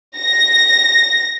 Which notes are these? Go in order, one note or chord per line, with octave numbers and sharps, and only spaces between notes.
A#6